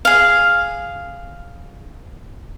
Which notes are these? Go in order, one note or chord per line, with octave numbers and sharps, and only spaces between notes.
G#4 F5